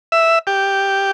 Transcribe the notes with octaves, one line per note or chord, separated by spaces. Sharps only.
E5
G4